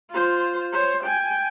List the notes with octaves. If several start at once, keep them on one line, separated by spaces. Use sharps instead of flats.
F4 C5
C5 C#5
G5 G#5